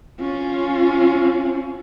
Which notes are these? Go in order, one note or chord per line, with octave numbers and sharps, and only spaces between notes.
C#4 F4